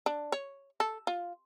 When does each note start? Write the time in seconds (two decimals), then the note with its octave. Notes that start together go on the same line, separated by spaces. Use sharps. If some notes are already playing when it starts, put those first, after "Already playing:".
0.06 D4
0.32 C#5
0.80 A4
1.07 F4